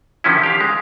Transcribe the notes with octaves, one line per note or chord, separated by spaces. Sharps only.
D3 D#3 F3 C#4 E4
G4 F5
G#3